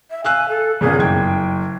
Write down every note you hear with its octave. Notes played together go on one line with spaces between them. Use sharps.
E5
F5 G#5 E6 F#6
A4
G1 A#2 C#3 G#4
F#1 G5 G#6